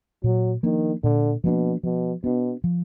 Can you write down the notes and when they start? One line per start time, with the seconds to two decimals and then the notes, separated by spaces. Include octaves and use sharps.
0.24 A#2 F#3
0.63 D#3 F3 A#3 D4
1.04 A#2 D3
1.44 B2 F3 A#3 D4
1.83 B2 F3
2.24 B2 B3 D4
2.64 F3